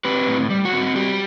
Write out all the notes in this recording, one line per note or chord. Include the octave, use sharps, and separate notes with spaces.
C4 G4 B4
A2
G3
F#4
C4
G3 G4